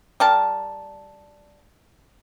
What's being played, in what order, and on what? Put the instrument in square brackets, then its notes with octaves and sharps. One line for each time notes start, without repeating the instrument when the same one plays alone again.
[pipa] G3 A#4 A5